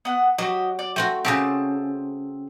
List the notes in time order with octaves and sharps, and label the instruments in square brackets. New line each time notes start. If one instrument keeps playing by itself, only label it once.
[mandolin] B3 F#5
[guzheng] F#3 [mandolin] F#4 G4 D#5
[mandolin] D5
[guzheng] A3 C4 F#4 [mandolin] G5
[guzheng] C#3 F#4 G4 [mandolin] C4 A5 D#6